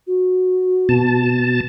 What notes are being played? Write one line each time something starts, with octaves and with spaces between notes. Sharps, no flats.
F#4
B2 A5